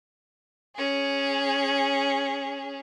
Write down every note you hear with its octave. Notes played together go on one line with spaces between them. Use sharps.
C#4 G#4